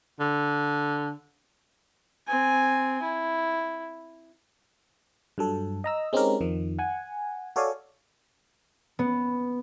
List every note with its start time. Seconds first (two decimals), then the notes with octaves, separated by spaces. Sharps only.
0.20 D3
2.28 C4 G#5
3.02 E4
5.38 G2 F#3 A4
5.84 D#5 A#5 E6
6.13 G#3 C4 C#4 D#4 G4 A#4
6.41 F2 D#3 F3
6.79 F#5 G#5
7.56 F#4 A4 C#5 D5 F5 G#5
8.99 B3